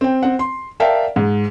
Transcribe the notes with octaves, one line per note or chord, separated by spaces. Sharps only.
C4 G5
C4 F#5
C6
A#4 D5 E5 F5 G5 A5
G#2